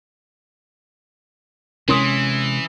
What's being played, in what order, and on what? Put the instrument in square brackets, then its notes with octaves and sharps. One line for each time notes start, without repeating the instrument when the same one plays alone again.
[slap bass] C3 G#3 [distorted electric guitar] E3 [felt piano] C#4 C6 D#6